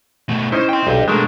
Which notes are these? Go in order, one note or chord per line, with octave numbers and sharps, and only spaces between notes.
B2 A3
C#4 D#4 E4 C5
G5 C6
B1 D4 G4
B2 G#3 A3 D4 A#4